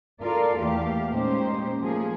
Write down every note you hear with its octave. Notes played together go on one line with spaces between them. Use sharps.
F4 A4 A#4 D5 F5
E2 A3 A#3 G4 F5
A#2 G#3 C#4 D#4 G4 C5
F3 A3 A#3 G#4